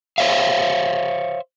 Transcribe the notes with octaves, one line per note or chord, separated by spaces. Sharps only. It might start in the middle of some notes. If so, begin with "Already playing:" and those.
C5 C#5 E5 F5